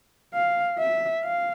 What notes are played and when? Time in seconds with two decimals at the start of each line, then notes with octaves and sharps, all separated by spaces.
0.34 F5
0.79 E5
1.24 F5